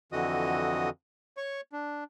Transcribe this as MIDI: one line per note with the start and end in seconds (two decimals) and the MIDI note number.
0.12 0.90 41
0.12 0.90 50
0.12 0.90 52
0.12 0.90 66
0.12 0.90 75
0.12 0.90 87
1.37 1.61 73
1.37 1.61 85
1.73 2.04 62